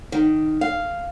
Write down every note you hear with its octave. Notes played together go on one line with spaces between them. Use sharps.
D#3
F5